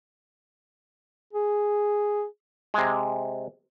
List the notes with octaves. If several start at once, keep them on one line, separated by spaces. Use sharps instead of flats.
G#4
C3 G#3